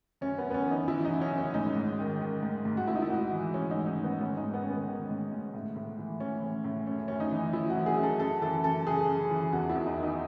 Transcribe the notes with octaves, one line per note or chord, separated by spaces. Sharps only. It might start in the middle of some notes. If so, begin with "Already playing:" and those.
F#2 C#4
B3
F#2
B3
C#4
E3
D#4
E3 E4
D#4
F#2
C#4
F#2
C#4
G#2 D#4
G#2
D#3
D#3
G#2
G#2
F#4
G#2 E4
D#4
E4
G#2 F#4
E3
E3 C#4
D#4
G#2
D#4
G#2
B3
G#2 C#4
D#4
G#2
B3
D#3 C#4
B3
D#3
G#2
G#2
A2
A2
E3
E3 C#4
A2
A2
F#2 C#4
F#2 C#4
D#4
E3
E3 E4
F#4
F#2
G#4
F#2
A4
F#2 A4
E3 A4
F#2 A4
C#3 G#4
F#2
E3
E2 F#4
E4
E2
D#4
D#3
D#4